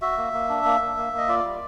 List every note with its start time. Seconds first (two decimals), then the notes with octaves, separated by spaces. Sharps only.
0.02 F#4 E5
0.17 A#3
0.33 A#3
0.49 D4
0.65 A#3
0.81 A#3
0.97 A#3
1.13 A#3 D#5
1.29 F4 D5
1.45 G3